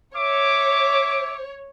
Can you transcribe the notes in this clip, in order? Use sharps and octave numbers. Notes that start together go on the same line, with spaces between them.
C#5 E5 D6